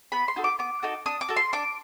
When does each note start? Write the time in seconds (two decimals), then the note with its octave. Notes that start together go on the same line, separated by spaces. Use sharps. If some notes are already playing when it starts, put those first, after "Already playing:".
0.12 B3 B5
0.28 C6
0.36 D#4 F#4 A4
0.44 D6
0.59 B3 D6
0.83 D#4 F#4 A4
1.06 D4 D#6
1.21 D6
1.29 F#4 A4
1.36 C6
1.53 D4 D6